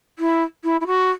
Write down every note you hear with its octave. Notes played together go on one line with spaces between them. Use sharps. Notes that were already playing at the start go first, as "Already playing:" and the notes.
E4
E4
E4
F#4